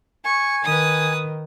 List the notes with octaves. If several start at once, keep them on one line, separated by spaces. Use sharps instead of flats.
G#5 C#6
D#3 B4 D#6